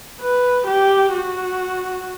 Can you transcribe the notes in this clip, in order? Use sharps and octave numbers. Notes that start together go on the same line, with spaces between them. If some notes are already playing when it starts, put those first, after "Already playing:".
B4
G4
F#4